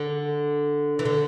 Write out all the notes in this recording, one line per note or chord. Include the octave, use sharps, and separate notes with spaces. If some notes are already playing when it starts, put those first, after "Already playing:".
Already playing: D3
E3
D3